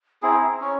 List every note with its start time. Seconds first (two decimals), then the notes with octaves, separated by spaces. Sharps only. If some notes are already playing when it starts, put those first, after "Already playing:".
0.22 C4 E4 G#4 A#5
0.61 C#4 C#5